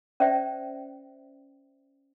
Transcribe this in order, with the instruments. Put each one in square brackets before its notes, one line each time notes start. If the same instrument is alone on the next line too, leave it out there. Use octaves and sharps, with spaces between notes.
[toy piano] C#4 C5 D5 E5 G5